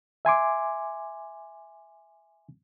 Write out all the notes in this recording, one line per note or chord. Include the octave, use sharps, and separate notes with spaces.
E5 G#5 C6 D6